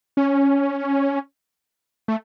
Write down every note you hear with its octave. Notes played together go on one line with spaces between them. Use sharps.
C#4
A3